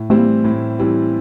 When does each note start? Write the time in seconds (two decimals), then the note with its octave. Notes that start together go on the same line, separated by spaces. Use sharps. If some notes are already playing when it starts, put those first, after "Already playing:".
Already playing: A2
0.10 E3 G3 A3 C4 E4
0.18 A#3
0.27 A3
0.44 A2
0.79 E3 G3 C4 E4